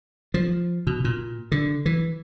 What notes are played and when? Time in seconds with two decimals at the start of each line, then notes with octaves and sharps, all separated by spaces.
0.34 F3
0.87 B2
1.04 A#2
1.52 D3
1.86 E3